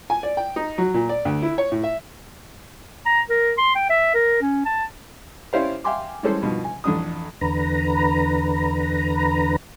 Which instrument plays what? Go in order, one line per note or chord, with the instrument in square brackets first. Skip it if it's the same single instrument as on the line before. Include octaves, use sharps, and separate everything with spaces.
[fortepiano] G#5
D5
G5
D#4
F#3
A#2
D5
D2
E4
C#5
A2
E5
[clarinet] A#5
A#4
C6
G5
E5
A#4
C#4
A5
[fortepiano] C#4 E4 G4 C5 D5 F5
E5 F5 G5 G#5 C6 D6
E3 G3 G#3 C#4 A4 C5
G2 B2 D#3 F3
G#5
A1 F2 D4 D#6
[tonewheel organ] E2 D3 B4 A#5